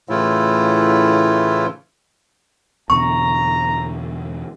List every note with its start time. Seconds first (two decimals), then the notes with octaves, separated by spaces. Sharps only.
0.09 A2 C#3 E3 A3 E4 F4
2.90 E2 B2 D3 A#5 C#6